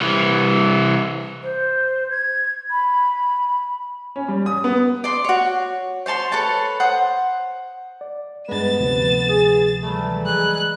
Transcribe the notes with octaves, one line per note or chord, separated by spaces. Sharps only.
C2 E3
C5
G#6
B5
C#4
G3
D#6
B3
D5 C6
F#4 C#5
C5 C#5 A5 C6
A4 B4 C#5 A5
C5 F#5 D#6
D5
G2 G#3 B3 A6 E7
D2 C3 F3
G#4
E3 F#3 G3 A3
G#3 F#6